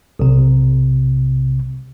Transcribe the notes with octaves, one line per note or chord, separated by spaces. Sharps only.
B1 C3